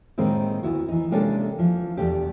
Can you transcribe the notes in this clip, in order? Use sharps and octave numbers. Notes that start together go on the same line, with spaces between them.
A2 D#3 G#3 A#3 C4
D2 B3 E4 F#4
E3 D#4
C3 G#3 A#3 C#4 D4 A4
E3 F3
E2 B2 A3 D4 G4